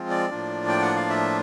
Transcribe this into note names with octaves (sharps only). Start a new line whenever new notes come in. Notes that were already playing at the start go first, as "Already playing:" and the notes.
Already playing: F3 G#3 C4 F4
D5
A2 F3 A#3 D4 F4
G5
F#5
F5
E5